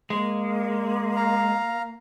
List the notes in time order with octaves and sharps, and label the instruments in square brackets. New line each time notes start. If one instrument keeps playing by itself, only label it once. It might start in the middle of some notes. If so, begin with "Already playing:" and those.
[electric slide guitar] G#3 [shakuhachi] A#3
[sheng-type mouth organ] F5 A#5